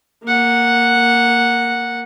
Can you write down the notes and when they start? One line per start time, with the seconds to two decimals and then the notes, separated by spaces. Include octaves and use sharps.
0.24 A#3 F#5